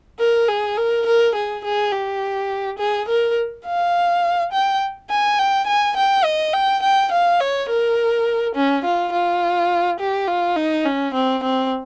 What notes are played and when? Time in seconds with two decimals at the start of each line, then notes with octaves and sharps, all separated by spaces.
0.20 A#4
0.49 G#4
0.78 A#4
1.07 A#4
1.35 G#4
1.65 G#4
1.92 G4
2.79 G#4
3.08 A#4
3.66 F5
4.52 G5
5.10 G#5
5.39 G5
5.67 G#5
5.97 G5
6.24 D#5
6.53 G5
6.83 G5
7.12 F5
7.40 C#5
7.69 A#4
8.55 C#4
8.85 F4
9.13 F4
10.00 G4
10.28 F4
10.56 D#4
10.85 C#4
11.14 C4
11.43 C4